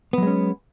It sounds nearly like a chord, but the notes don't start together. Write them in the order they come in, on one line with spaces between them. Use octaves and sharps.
B3 F#3 G#3 C#4